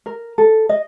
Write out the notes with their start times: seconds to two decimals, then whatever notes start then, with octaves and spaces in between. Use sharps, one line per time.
0.06 A#4
0.38 A4
0.69 D#5